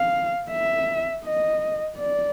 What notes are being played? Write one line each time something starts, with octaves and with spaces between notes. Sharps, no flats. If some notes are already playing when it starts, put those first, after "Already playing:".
Already playing: F5
E5
D#5
D5